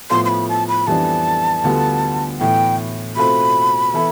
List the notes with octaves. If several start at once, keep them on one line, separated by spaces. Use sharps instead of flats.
A2 F3 B3 F4 A4 C6
C6
B5
A5
B5
F2 E3 G3 B3 D4 A5
D2 D3 G3 B3 F4
A2 E3 B3 G5
B2 A3 C4 F4 A4 B5
E3 B3 E4 A4